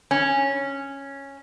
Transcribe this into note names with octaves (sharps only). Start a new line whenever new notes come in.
C#4